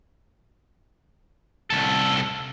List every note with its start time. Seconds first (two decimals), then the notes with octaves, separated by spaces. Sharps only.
1.70 C2 A4